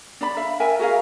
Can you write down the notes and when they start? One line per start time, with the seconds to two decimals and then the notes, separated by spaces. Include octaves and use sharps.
0.21 D4 D5 B5
0.37 E5 F5
0.60 A#4 E5 G5 G#5
0.79 F#4 G#4 A#4 F5